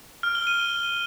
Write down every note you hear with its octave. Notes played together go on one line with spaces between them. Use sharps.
F6
G7
D#7